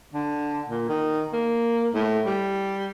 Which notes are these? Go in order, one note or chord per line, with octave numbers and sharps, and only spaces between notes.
D3
A#2
D#3
A#3
A2
G3